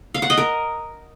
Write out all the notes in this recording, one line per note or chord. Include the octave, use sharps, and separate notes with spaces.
F5
F#5
D#5
A#4